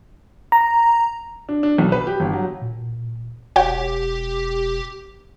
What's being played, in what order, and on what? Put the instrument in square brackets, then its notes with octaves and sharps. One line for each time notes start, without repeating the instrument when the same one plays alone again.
[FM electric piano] A#5
[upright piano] D4
D4
B1
B4
G4
G1
F#3
[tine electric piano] A#2
[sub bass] E1 [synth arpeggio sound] F#4 C#5 G5 [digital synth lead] G4